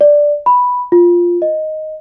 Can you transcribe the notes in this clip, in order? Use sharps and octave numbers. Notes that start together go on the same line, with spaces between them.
D5
B5
F4
D#5